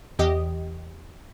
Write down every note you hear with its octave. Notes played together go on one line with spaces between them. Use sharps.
E2 G4 D#5